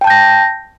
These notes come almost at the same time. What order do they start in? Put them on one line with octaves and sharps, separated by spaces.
G5 A5 G6 A#6